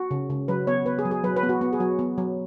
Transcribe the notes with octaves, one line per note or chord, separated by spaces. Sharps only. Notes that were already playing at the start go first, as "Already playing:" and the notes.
Already playing: F#4
C#3
C#3
F#3 B4
B3 C#5
B3 B4
G#4
F#3
G#4
F#3 B4
B4
B3
F#4
B3
G#4
F#3 F#4
B3
F#3